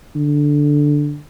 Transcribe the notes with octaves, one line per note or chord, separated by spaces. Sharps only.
D3